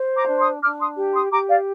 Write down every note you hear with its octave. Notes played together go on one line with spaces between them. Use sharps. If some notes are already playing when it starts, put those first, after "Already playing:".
Already playing: C5
A#5 D6
D4
C6 D#6
D4 D6 F6
C6 D#6
G4
C6 D#6
G4 A#5 D6
D5 F5